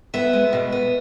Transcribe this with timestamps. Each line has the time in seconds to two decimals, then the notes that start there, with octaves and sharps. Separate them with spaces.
0.14 B3 E5
0.33 G#3
0.53 B2
0.72 B3